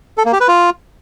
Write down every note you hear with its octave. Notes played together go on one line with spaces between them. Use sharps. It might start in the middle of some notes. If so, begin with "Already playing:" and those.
A4
A#3
G4
B4
F4